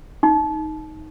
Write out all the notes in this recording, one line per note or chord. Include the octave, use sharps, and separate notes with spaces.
D#4